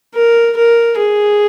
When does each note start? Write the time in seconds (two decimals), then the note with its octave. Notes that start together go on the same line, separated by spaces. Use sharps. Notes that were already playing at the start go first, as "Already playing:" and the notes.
0.15 A#4
0.57 A#4
0.98 G#4